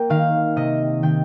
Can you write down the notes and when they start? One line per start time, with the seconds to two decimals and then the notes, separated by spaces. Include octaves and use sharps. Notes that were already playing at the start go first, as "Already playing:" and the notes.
Already playing: A#3 G5
0.10 D#3 F5
0.56 C3 D#5
1.03 D#3 G5